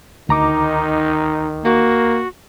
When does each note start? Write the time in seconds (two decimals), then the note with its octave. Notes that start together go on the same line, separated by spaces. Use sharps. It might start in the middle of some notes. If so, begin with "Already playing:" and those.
0.29 D2 D#3 D#4 A#5 D6
1.65 A#3 F#4